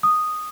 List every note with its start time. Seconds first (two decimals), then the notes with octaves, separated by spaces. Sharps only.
0.03 D#6